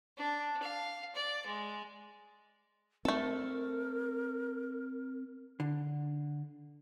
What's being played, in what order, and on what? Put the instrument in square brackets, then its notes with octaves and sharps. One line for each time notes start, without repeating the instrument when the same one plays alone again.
[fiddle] D4
F5
D5
G#3
[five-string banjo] A3 A4 [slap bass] C4 [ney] A#4
[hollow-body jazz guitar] D3